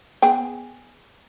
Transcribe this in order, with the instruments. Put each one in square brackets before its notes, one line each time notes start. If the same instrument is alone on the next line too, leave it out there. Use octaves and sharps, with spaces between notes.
[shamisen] B3 G#4 G5